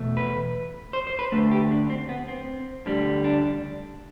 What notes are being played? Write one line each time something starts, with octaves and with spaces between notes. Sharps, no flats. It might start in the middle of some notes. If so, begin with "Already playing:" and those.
Already playing: E2 B2 A3
B4
C5
C5
B4
D2 D3 A3 B4
G4
D4
C4
B3
C4
D2 D3 G3
D4